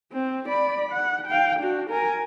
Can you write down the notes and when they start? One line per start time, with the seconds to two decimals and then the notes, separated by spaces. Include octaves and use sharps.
0.13 C4
0.49 D5 B5
0.92 F#5
1.27 F5 G5
1.59 D4 F#4
1.90 A#4 G#5